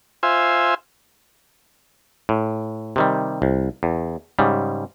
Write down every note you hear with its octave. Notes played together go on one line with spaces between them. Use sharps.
F4 C5 E5 G#5
A2
C3 D#3 G3
C2
E2
G#2 C#3 G3